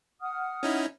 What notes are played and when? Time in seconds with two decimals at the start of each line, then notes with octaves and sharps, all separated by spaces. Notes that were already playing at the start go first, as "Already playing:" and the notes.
0.21 F#5 D#6 F6
0.63 C#4 D#4 E4